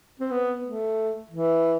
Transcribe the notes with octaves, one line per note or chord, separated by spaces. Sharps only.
C4
B3
A3
E3